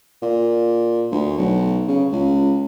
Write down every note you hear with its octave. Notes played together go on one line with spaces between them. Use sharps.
A#2
D2
B1
C#3
C#2